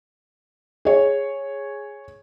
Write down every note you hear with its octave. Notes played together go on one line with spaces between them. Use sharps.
G#4 C#5